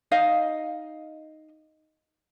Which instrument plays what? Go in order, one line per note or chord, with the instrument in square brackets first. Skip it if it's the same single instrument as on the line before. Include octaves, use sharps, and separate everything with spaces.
[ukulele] D#4 D#5 F5